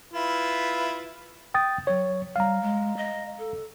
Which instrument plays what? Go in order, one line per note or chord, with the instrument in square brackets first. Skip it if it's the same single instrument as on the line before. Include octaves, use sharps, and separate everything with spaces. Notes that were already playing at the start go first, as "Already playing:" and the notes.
[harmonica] E4 F4 B4
[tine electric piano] G5 D#6 A6
[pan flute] F#3 [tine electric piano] C#5
[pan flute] G3 [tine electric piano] F5 A#5
[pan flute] G#3
D#5
A4